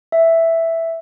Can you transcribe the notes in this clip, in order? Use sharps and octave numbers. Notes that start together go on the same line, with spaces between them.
E5